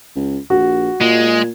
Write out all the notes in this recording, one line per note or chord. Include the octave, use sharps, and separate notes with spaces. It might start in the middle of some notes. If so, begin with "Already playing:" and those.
C#2
A#1 F#4
A#2 G#3